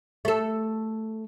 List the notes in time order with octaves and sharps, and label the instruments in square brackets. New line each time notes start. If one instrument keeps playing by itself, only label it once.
[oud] A3 A4